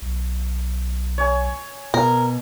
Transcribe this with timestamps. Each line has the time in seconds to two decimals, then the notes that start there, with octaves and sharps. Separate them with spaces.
0.02 B1
1.18 C#5 G#5
1.94 B2 A#4